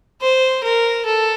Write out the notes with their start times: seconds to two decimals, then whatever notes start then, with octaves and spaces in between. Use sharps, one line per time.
0.22 C5
0.64 A#4
1.06 A4